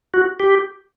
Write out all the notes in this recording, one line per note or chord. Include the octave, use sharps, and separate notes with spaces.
F#4
G4